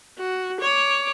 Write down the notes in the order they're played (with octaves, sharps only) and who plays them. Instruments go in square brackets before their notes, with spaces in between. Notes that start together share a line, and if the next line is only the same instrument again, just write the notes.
[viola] F#4
C#5 D6